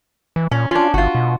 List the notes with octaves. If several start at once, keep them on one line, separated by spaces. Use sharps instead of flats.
E3
A#2 C#4
C#4 D4 F4
G1 F4 F#4
B2